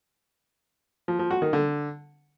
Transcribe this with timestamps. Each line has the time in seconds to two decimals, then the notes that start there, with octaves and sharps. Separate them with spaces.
1.08 F3
1.19 F3
1.31 F#4
1.42 D#3
1.53 D3